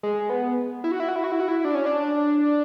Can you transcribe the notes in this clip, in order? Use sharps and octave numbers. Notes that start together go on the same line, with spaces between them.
G#3
B3
E4
F#4
E4
F#4
E4
F#4
E4
F#4
E4
D4
C#4
D4